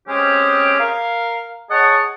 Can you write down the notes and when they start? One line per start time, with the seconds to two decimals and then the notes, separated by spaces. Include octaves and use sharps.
0.08 G#3 C4 C#4 G4 G#4
0.80 A#4 F5
1.71 G#4 C#5 D#5 F#5 A5